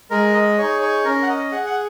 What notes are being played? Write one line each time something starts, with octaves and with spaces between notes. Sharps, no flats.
G#3 A#4
D#5
D#4 G#4 C#5
C#5
C#4 A#4
F#5
D#5
G#4 F#5
F#5